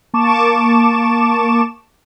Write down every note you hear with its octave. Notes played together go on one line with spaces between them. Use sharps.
A#3 A5 C#6 D6 E7